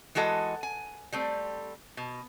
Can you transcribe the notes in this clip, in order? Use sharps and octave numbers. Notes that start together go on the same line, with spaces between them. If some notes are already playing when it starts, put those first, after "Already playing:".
E3 G#3 F#4 A4 D#5
G#5
G3 A3 C4
B2